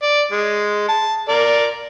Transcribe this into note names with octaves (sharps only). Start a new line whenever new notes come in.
D5
G#3
A5
A#4 D5